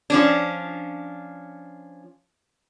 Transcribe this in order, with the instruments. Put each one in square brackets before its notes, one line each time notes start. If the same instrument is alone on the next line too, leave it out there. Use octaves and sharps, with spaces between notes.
[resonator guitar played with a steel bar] F3 C#4 D4